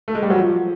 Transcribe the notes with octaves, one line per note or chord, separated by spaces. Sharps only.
A3
G#3
G3
F#3
F3